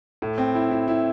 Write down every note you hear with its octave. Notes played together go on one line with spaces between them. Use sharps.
A2
C4
E4
E4
E4